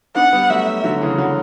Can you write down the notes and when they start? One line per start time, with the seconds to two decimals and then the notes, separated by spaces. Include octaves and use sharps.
0.16 B3 D4 F#5
0.33 G3 B3
0.50 F#3 A3 E5
0.84 D3 F#3
1.01 C#3 E3
1.18 D3 F#3